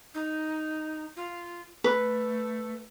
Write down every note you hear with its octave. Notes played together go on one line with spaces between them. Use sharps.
D#4
F4
A3 B4